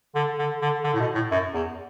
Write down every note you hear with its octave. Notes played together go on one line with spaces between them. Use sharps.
D3
D3
D3
D3
A2
B2
A2
F#2
E2